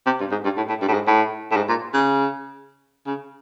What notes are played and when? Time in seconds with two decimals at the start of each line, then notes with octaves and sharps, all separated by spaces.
0.06 C3
0.20 G2
0.31 G#2
0.44 G2
0.57 A2
0.69 A2
0.82 G2
0.88 A2
0.93 G#2
1.07 A2
1.51 A2
1.56 G#2
1.69 A#2
1.93 C#3
3.06 C#3